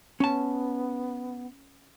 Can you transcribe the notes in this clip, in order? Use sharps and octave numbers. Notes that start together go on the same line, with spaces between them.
B3 C#4 A5